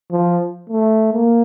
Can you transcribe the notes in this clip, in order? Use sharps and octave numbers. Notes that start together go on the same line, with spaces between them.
F3
A3
A#3